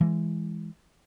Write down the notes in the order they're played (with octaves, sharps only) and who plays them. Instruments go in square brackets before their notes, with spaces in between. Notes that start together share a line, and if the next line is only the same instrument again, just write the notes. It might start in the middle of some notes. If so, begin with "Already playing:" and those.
[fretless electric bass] E3 G#3